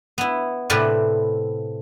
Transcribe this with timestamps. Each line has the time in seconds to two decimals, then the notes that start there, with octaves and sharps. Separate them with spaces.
0.18 B3 E4
0.70 A2 C3 A3 B4 D5